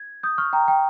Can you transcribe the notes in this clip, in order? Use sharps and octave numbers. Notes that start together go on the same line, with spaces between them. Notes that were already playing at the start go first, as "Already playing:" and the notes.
Already playing: G#6
D#6 G6
C#6 F6
G5 A#5
G5